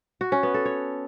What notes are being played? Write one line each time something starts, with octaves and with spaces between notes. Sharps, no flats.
F#4
C#4
B3
A4
C#5